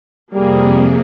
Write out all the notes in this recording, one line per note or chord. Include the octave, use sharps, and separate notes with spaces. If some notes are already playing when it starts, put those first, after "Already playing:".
F2 C3 G3 A#3 G#4